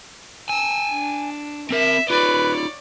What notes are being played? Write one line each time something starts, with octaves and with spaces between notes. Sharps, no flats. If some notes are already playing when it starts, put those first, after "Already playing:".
G5 G#5 E6
D4
C4 A#4 E5
D#4 F4 B4 C#5 D5